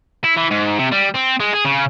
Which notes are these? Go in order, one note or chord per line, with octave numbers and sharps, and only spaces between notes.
E4
E3
G#2
C3
G3
C4
G#3
G#4
C#3